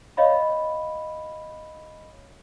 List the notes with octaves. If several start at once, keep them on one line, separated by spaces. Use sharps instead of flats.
C#5 D#5 F5 B5